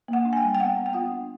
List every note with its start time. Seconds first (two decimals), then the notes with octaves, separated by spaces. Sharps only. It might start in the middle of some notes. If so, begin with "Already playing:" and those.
0.08 A#3 F#5
0.25 D4
0.33 G#5
0.37 G5
0.43 G3
0.55 G5
0.60 B3 F#5
0.77 B3
0.86 G5
0.93 F4 F#5
1.11 D4